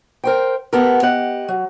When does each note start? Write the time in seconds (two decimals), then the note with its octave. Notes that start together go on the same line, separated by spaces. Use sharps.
0.24 A#4 C5 G5
0.73 B3 G4 A4 A#4
1.03 G4 D#5 F#5
1.48 F#3